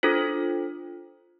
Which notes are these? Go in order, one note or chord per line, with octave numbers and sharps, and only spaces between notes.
D4 F4 A4 C5